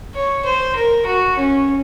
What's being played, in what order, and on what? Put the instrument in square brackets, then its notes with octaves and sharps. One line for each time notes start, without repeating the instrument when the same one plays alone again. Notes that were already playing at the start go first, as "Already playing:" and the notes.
[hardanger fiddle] C#5
C5
A#4
F#4
C#4